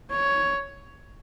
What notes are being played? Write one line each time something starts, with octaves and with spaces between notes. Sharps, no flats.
C#5